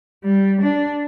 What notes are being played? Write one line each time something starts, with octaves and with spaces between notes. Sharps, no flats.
G3
D4